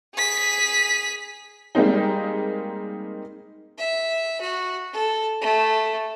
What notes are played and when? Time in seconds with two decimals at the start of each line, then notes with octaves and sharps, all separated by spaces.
0.15 G#4 B6
1.75 G3 G#3 A#3 C4 D#4
3.78 E5
4.41 F#4
4.93 A4
5.41 A3